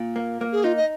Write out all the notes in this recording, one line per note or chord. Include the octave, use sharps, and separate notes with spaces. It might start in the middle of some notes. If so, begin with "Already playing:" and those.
Already playing: A#2
A#3
A#3
G#4
D#4 F4
D#5